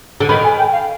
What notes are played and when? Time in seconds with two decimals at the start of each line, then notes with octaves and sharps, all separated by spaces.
0.20 D3
0.29 D#3 B5
0.44 G#5
0.58 G5
0.72 F5